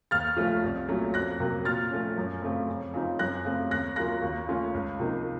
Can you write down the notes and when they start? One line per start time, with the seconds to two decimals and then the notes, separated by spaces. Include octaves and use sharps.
0.11 D#2 F6 A6
0.37 C#3 F3 A3
0.63 C2
0.88 A#2 F#3 A3 C#4
1.14 F2 F#6 A#6
1.40 C3 F#3 A#3
1.65 A#2 F6 A6
1.91 F3 A3 C#4
2.17 F#2
2.42 C#3 A3 C4
2.68 F2
2.94 C#3 F3 C4 D#4
3.19 F#2 F#6 A#6
3.45 C#3 A3 C4
3.71 D#2 F#6 A#6
3.96 C#3 F#3 A#3 F4 F#6 A#6
4.22 D#2
4.48 C#3 A3 C#4 F4
4.74 C#2
4.99 C3 F3 A#3 D#4